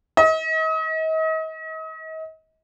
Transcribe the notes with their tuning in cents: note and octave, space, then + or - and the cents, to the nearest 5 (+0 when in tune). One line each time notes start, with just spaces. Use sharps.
D#5 +40